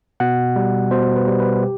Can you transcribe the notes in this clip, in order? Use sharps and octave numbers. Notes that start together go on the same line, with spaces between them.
B2 F#5
G3
B2 C5
B4
G3
B4
G4